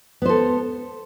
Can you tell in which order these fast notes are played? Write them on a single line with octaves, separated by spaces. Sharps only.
B3 C5 A4